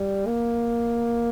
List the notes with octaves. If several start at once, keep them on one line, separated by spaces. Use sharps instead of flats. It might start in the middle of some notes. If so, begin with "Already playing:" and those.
Already playing: G3
A#3